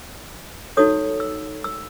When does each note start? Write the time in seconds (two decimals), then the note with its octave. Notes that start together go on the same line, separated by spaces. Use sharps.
0.77 D#4 F#4 A4 C#5 D#6
1.20 E6
1.64 E6